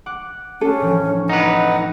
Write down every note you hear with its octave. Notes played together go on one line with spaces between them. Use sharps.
F#5 D6 F#6
C#4 D4 A4
A2 E3 F3
D#4 B4 F#5